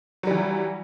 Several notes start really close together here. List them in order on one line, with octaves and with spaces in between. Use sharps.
F#3 G3 E3